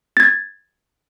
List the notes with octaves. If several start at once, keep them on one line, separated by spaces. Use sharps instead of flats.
G#6 A6